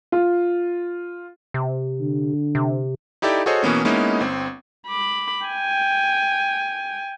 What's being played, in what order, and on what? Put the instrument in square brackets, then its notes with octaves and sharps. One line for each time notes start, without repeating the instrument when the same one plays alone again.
[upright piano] F4
[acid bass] C3
[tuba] D3
[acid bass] C3
[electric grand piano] D#4 E4 G4 A4 D5
F#4 G#4 A4 C5 C#5 D#5
B2 E3 A#3 B3 C#4
G#3 A#3 B3 C#4 D#4 E4
G1 C4
[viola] B5 D6
G5 G#5